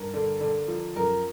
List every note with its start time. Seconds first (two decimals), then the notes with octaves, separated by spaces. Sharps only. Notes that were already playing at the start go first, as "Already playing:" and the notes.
Already playing: G2 A#4
0.14 D3
0.41 D3
0.68 F3
0.96 F#2 A#4